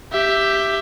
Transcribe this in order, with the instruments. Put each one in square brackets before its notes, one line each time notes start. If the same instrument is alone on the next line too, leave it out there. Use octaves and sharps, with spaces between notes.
[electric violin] G4 E5